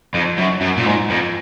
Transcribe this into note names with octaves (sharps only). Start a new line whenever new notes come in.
F2
F#2
F#2
A#2
G#2
F2